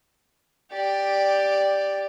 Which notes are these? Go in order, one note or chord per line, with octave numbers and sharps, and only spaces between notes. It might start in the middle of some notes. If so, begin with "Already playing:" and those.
G4 D5